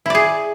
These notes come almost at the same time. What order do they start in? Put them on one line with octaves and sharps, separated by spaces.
E4 D5 G#4